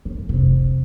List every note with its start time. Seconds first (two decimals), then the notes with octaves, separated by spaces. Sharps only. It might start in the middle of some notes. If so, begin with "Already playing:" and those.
0.05 D#3
0.29 F1 C3